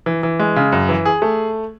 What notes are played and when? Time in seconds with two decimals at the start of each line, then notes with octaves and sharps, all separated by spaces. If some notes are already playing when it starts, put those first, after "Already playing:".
0.06 E3
0.23 E3
0.40 G#3
0.56 C#3
0.72 F#2
0.89 E3
1.05 G#4
1.22 A3